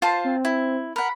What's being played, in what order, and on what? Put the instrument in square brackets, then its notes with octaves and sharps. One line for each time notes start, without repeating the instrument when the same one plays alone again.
[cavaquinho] F4 C5 A5
[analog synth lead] C4
[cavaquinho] E4
[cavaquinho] A#4 F#5 [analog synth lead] B5